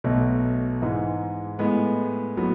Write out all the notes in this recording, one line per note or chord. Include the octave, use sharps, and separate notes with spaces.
B1 B2 A3
G#2 E3 G#3
A2 G#3 B3
A2 F#3 B3